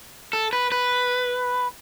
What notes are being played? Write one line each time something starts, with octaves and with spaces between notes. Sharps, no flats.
A4
B4
B4